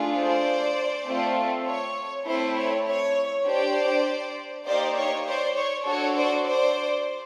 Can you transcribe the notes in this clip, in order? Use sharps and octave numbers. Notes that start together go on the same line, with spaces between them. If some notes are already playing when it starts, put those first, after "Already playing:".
Already playing: A3 D4 F4 G#4
C5 D5
A3 C4 F4 A4
C#5
A3 C4 E4 A4 C5
C#5
C#5
D4 G4 C5 D5
A#3 D#4 G4 C5 D5
C#5
C5 D5
C#5
D4 F#4 A4 C#5
C5 D5
C5 D5